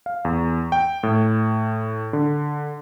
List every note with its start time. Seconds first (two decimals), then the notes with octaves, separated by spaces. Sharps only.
0.06 F5
0.25 E2
0.72 G5
1.03 A2
2.13 D3